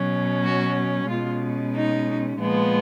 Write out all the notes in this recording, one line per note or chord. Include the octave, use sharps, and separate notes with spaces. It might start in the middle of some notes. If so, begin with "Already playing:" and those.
Already playing: B2 F#3 C#4
F#4
B2 G#3 C#4 F4
D#4
A#2 F3 G#3 B3